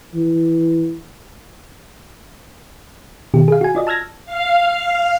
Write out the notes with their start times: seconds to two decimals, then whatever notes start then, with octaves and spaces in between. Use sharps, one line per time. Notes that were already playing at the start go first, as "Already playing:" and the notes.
0.15 E3
3.34 B2 D#3 G4
3.48 G#4 F5
3.61 F#4 G#5
3.75 F4 D5 D#5
3.87 A5 E6 F6 G#6 A#6
4.25 F5